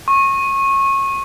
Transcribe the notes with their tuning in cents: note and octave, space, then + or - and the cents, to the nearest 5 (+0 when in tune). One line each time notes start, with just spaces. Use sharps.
C#6 -25